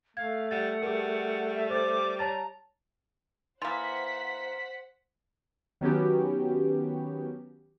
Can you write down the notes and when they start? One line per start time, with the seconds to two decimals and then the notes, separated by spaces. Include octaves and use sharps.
0.17 A3 F5 G#6
0.51 G3 F#5 A6
0.82 G3 G#4 A#4
1.55 E5
1.70 C5 D6 A6
2.19 C#5 A5 A#5 A6
3.62 E3 A#3 C5 F#5 C6 A6 B6
5.81 D#3 F#3 B3 C#4 F#4 G4